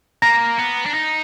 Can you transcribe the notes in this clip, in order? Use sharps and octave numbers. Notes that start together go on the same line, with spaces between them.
A#3 A#5 A#6
B3
D4
D#4